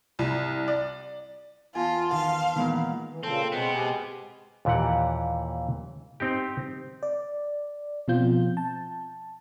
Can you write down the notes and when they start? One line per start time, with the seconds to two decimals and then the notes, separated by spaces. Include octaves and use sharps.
0.19 C2
0.68 D5
1.75 E2 F4 G#5 A5 C6
2.13 D#3 F5
2.56 A#2 D#3 E3 G#3 B3 B5
3.10 E3
3.23 A#2 C#3 C4 A4
3.52 B2 G#3 B3 C4
3.75 G#3 G4 G#5
4.65 D#2 A#2 E3 G4 F#5
6.20 C4 D#4 G4
7.03 D5
8.08 B2 F3 C4 F4 G6
8.57 A5